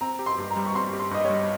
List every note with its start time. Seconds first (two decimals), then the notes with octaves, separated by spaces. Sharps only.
0.01 C4 A#5
0.19 G4
0.26 C6
0.38 G2
0.51 A#5
0.56 G3
0.66 C#6
0.75 C4 C6
0.93 G4
0.99 C6
1.11 G2 D#5
1.25 C#5
1.30 G3